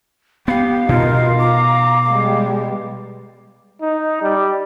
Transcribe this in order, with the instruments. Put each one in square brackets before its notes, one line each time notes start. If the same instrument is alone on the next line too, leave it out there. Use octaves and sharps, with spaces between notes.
[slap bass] B3 [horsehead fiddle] G4 [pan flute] F5
[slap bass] B2 [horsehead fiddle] D#4 A#4 [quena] F4
[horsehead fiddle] A#5 [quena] D6
[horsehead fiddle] G3 G#3
[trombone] D#4
G3